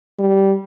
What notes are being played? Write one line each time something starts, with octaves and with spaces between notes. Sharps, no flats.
G3